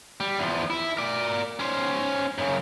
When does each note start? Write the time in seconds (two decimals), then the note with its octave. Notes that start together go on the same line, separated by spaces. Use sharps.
0.20 G3
0.38 E2 F3
0.70 E4
0.97 A#4 D5
1.59 C#4 C5
2.38 F#2 C#3